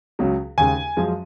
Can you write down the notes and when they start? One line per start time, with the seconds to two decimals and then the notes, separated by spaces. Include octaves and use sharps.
0.19 C#2 C#3 F#3
0.58 D#2 C#3 G#3 G#5
0.97 F#2 F3 G#3